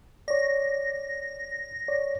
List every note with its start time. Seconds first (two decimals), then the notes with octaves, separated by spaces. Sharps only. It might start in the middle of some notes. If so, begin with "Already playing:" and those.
0.28 C#5 D5 A#6
1.88 C#5 D5